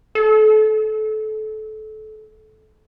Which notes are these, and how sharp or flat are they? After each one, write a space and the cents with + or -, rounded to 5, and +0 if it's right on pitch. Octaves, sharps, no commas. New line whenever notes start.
A4 -25